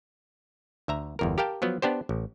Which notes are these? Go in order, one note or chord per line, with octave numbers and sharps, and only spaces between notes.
D2 E5 A#5
G1 E2 A#4
G4 A#4 F5 G5 A5
F3 F#3 B3
B3 D4 G4 C5
A1